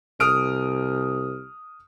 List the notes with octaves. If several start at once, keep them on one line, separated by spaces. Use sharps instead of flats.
C2 D#6 F6 D7